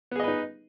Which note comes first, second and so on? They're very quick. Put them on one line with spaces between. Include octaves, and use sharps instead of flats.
B3 G#4 D#5 B4 D#4